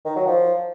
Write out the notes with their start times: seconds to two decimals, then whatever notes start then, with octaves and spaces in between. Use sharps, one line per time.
0.05 D#3
0.16 F#3
0.27 F3